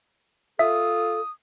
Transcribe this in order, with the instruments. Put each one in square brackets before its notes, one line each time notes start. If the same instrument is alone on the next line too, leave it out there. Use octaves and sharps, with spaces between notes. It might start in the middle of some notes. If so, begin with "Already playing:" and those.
[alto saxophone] F4 [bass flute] A4 [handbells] E5 [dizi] D#6